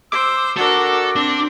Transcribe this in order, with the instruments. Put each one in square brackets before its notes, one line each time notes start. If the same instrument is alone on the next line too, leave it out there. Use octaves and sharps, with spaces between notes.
[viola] C5 [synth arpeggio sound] D6 [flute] E6
[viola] D4 A#4 [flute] F#4 [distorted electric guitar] A4
[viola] C4 [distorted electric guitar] D4